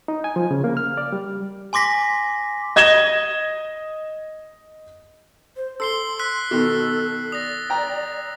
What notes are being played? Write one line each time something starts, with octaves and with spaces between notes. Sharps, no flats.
D#4
G#5
F3
C#3
A#3
F6
D5
G3
G#5 C6 D6 A#6 B6
D#5 G#6 A#6 E7 G7
C5
A4 C6 E6 C7 G7
E6 F#6 B6
B2 D#3 A4
D5 D#6 A#6
G5 A#5